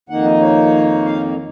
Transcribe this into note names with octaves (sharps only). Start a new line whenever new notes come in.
F2 D#3 A#3 D#4 F#5
D#5
C#5
F5